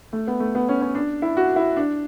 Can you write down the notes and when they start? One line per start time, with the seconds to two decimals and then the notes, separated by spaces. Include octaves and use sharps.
0.13 A3
0.27 B3
0.40 A3
0.55 B3
0.69 C#4
0.81 C#4
0.95 D4
1.22 E4
1.37 F#4
1.56 E4
1.77 D4